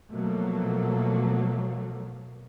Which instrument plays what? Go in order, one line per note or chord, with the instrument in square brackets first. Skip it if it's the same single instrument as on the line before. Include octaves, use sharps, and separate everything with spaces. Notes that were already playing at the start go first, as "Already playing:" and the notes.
[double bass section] B2 F3 F#3 A3 A#3